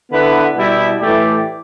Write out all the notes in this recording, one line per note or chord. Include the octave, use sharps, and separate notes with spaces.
D3 B3 E4 B4
B2 G3 E4
A2 E3 A3 G4 D5